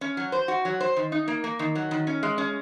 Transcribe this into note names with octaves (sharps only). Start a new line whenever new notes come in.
C#4
F#3
C5
F#4
F#3
C5
D#3
D#4
A#3
A#3
D#3
F#3
D#3
C#4
G#3
C#4